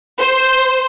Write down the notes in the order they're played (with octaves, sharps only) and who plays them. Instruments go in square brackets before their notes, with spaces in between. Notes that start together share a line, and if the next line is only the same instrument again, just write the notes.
[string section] C5